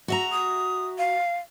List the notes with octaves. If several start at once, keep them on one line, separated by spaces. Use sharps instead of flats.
F#4 E5 A#5
D#6
F5